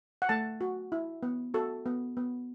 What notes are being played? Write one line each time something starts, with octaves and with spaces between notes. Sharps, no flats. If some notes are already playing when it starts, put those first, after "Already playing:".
F#5
A3 A5
F#4
E4
B3
F#4 A4
B3
B3